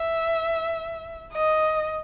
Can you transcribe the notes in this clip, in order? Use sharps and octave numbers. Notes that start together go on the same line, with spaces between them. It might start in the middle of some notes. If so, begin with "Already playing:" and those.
Already playing: E5
D#5